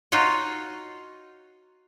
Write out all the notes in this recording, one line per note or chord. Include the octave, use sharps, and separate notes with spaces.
D#4 F4 F#4 C#5 D#5